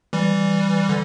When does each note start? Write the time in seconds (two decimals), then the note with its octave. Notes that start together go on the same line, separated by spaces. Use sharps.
0.13 E3 G3
0.89 D3